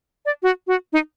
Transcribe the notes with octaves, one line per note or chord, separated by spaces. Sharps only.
D5
F#4
F#4
D#4